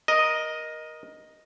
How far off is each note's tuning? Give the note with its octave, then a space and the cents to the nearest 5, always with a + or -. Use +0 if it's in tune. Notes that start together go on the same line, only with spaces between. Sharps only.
A#4 +20 D#5 +0